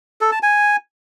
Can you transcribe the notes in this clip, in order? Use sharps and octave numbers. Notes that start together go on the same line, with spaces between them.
A4
A5
G#5